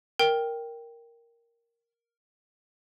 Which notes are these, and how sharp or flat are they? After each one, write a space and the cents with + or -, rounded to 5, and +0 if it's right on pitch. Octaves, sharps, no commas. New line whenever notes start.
A#4 +0 G5 +0